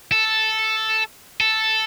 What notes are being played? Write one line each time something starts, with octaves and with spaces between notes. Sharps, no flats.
A4
A4